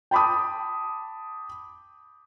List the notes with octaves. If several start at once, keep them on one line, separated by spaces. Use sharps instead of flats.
G5 A5 B5 D6 D#6